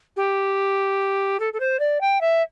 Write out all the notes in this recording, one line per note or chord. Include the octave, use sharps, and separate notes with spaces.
G4
A4
A4
C5
D5
G5
E5